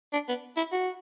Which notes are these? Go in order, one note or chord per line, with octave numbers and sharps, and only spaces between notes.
D4
B3
E4
F#4